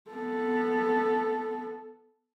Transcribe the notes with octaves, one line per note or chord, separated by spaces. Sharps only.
B3 A4